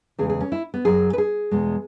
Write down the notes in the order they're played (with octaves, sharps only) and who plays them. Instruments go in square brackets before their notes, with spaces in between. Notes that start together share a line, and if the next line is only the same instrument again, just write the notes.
[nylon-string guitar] E2 C#3 G#3 G#4
G#4
C#4
E4
B3
F#2 F#3 G#4
B4
G#4
E2 B2 G#3